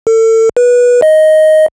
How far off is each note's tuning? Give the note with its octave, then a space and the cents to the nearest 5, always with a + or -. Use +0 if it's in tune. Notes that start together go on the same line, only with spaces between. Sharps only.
A4 +35
B4 -20
D#5 +5